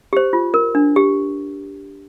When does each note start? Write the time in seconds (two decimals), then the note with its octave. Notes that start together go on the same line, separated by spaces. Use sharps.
0.13 G4 C5
0.33 F4
0.54 A#4
0.75 D4
0.96 G4